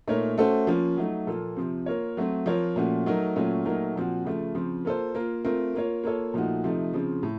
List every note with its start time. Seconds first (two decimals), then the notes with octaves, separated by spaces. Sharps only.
0.08 A#2 A3 D#4 A#4 C#5
0.38 A3 C#4 F#4 A4 C5
0.67 F3 A#3 C#4 F4
0.97 F#3 A3 D#4
1.27 A#2 F3 A#3 F4 A4
1.57 C3 F3 C4
1.86 A#3 F4 A#4 C#5
2.17 F#3 A3 C4
2.46 F3 C4 F4 A#4 C#5
2.76 A#2 F3 A3 C#4 F#4
3.06 F#3 A3 D#4 A#4
3.36 A#2 F#3 A3 C#4 F4
3.65 A#2 F#3 A3 D#4 A#4
3.96 A#2 F3 C4 F#4
4.25 C#3 F3 A3
4.55 C#3 F3 C4
4.85 A#3 F4 A4 C5
5.15 A#3 F4 A#4
5.44 A3 C4 F4 A#4
5.75 A#3 F4 A#4 C#5
6.04 A#3 F4 A4 C#5
6.34 A#2 F3 A3 D#4 F#4
6.64 C3 F3 A3 D#4
6.93 C#3 F3 C4
7.23 A2